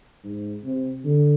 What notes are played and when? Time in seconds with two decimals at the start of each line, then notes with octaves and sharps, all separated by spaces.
0.24 G#2
0.64 C3
1.05 D3